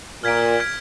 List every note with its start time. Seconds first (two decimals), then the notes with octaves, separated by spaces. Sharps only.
0.23 A#2 F6 G#6 B6 D7
0.60 F6 G#6 B6 D7